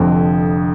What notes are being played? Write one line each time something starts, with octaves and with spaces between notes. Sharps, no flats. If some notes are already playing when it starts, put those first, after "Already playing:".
Already playing: F1 F2 D3